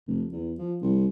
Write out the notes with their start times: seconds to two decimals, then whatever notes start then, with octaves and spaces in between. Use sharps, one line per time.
0.07 F1
0.32 E2
0.58 F3
0.82 C2